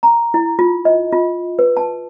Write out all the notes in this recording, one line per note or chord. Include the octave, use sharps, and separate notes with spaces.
A#5
E4
F4
D#5
F4
B4
A5